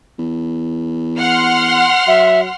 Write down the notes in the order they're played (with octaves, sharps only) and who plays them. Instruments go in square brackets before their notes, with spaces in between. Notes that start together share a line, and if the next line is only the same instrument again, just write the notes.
[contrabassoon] E2
[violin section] F#5 C6 F6
[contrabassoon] F#3 [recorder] E5